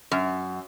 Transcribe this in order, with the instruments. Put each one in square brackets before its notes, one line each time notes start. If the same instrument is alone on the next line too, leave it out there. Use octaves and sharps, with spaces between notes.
[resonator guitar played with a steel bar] F#2